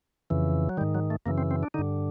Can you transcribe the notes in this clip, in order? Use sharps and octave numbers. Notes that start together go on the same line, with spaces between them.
F2 C#3 E3
F#3
G#2 D#3 G3
F#3
A3
F#2 C#3 E3 A#3
C4
C4
D4
G2 D3 D#4